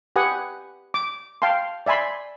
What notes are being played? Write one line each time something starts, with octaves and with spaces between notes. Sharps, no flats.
G4 B4 F#5 G#5 D#6
D6
F5 G5 A5 C6
D5 E5 G#5 B5 C6